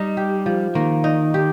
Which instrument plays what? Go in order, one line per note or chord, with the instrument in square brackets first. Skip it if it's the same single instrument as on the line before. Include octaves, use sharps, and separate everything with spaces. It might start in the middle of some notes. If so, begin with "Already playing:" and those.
Already playing: [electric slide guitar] G3 [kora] D#4
[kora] G4
F3
[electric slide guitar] D#3 [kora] A#3
[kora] D#4
G4